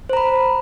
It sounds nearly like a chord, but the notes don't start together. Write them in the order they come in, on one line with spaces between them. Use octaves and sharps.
C5 A#5 B5